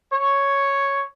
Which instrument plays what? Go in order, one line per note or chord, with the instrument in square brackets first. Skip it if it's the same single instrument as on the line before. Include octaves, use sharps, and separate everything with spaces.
[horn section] C#5